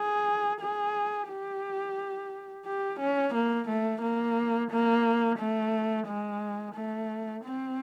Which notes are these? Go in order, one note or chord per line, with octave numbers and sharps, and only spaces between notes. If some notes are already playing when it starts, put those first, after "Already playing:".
Already playing: G#4
G#4
G4
G4
C#4
A#3
A3
A#3
A#3
A3
G#3
A3
C4